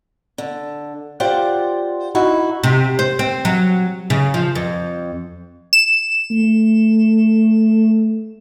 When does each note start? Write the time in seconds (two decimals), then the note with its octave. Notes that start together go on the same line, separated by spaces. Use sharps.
0.38 D3
1.20 F4 G4 C5 D5 F#5
2.15 D#4 E4 F#4
2.63 C3
2.99 C5
3.19 C4
3.45 F#3
4.10 C#3
4.34 F3
4.55 F2
5.73 E7
6.31 A3